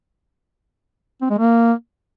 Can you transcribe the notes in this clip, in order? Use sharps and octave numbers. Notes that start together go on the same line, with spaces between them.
C4
G#3
A#3